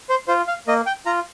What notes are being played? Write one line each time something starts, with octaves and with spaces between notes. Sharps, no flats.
C5
F4 C5
F5
A#3 D#5
G5
F4 A#5